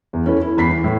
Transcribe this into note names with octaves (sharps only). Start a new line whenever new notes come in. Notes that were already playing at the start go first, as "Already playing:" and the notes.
E2
C#4 E4 A4 B4
E4
E2 B5 B6 C7
E3
A2